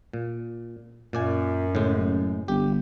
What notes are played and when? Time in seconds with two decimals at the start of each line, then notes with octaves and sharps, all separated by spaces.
0.13 A#2
1.13 F#2 A#2 D5 G#5
1.75 A2 C#3 G#3
1.97 F#1
2.48 G1 G4